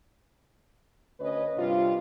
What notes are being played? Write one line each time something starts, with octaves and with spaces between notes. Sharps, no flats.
D2 C#4 B4 C#5 D#5
G2 C3 D4 F4